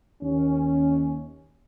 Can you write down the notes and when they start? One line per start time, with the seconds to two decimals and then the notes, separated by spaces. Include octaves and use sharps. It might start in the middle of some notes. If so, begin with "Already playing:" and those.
0.22 D#2 C#4